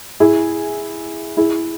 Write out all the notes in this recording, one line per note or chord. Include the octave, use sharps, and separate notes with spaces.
E4 G#4
E4 G#4